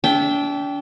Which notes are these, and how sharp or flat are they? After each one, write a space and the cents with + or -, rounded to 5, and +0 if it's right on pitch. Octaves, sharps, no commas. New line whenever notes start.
D4 -35 E5 +0 G5 +0